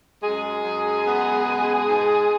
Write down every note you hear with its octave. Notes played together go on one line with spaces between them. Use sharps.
F#2 G#3 G#4
F#2
B3
B2
G#2